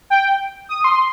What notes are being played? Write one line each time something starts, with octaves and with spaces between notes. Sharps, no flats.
G5
D#6
C6